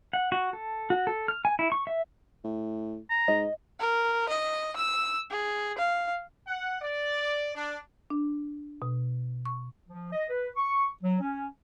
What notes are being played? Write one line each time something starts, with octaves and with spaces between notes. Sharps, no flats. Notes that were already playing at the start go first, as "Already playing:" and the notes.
F#5
F#4
A4
F#4
A4
F6
G#5
E4
C#6
E5
A2
A#5
G#2 D#5
A#4
D#5
E6
G#4
F5
F#5
D5
D4
D4
B2
C#6
F3
D#5
B4
C#6
F#3
C#4